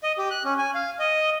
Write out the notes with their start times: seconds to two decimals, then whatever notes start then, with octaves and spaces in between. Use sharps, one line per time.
0.03 D#5
0.18 G4
0.31 F#6
0.45 C#4
0.58 G#5
0.75 F5
0.99 D#5